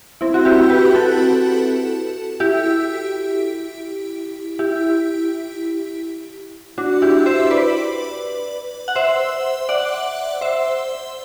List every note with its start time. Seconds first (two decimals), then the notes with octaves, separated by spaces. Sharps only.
0.21 C4 E4
0.34 F#4
0.45 E4 G4
0.70 G4 B4
0.95 F#4 A4
2.40 E4 G4
4.59 E4 G4
6.78 D4 F#4
7.02 E4 G4
7.26 C5 E5
7.51 B4 D5
8.88 F#5
8.96 C5 E5
9.69 D5 F#5
10.41 C5 E5